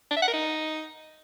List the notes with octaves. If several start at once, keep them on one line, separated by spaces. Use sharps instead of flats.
D4
E5
F#5
A#4
D#4